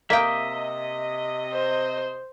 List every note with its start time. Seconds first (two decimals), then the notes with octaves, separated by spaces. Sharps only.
0.10 C3 A#3 D#5 E5 G5 D#6
1.51 C5